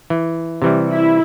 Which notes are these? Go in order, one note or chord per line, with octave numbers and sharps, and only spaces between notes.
E3
C3 E3 G3
E4